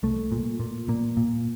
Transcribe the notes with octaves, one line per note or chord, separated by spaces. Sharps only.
C2 A3
A#2
A#2
A#2 A#3
A#2